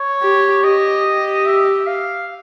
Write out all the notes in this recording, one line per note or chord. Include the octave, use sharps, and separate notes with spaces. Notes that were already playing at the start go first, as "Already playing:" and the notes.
Already playing: C#5
G4
G4 D#5
G4
E5
F5